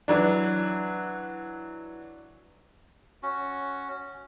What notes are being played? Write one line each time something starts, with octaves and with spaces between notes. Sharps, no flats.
E3 F#3 D4
C#4 F#4